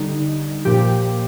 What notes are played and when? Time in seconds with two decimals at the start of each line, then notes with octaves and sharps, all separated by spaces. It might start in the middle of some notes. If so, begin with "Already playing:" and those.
Already playing: D3 G3 D#4
0.65 A#2 F3 G4